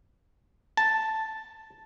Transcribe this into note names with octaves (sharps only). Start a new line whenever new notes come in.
A5